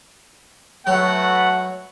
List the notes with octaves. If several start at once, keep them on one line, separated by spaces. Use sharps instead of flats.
F#3 A3 F#4 B4 F#5